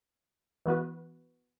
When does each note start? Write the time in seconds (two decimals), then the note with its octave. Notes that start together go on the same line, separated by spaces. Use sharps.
0.66 E3 B3 F#4 B4